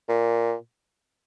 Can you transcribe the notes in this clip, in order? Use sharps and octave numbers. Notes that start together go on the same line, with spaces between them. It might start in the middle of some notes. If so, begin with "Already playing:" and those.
A#2